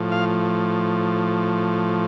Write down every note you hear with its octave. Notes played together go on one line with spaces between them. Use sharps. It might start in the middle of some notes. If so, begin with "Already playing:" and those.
Already playing: A2 F3
F5